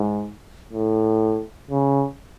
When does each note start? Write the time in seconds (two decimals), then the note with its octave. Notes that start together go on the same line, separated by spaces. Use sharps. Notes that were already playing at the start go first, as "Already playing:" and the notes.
Already playing: G#2
0.72 A2
1.70 C#3